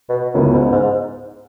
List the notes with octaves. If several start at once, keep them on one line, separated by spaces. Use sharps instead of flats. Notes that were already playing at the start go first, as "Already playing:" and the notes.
B2
C#2 F#2 C#3 G#3 B3 E4
G#2
G#2